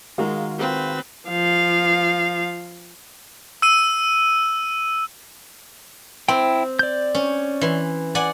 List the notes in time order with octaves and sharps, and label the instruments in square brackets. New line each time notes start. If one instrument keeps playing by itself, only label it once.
[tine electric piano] D#3 F#4 [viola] G#3 [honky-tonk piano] F4 G#4 A#4
[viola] C4 B4
F3 F5
[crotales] E6 D#7
[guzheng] C4 [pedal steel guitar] E4 G5
[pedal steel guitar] D5 G6
[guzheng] C#4
E3 C6
D5 F#5 G#5